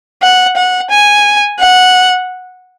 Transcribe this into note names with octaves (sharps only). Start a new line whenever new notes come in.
F#5
F#5
G#5
F#5